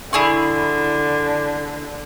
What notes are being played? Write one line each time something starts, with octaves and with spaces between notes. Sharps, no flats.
D3 E4 G#4 C#6